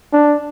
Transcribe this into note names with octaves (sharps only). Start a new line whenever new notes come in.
D4